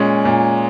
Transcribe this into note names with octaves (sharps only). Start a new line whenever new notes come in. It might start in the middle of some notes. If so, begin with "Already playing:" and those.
Already playing: A#2 G#3 C#4
A#2